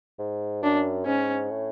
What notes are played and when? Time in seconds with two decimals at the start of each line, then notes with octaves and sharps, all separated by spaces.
0.19 G#2
0.63 F#2 D4
1.06 G#2 C#4
1.51 A2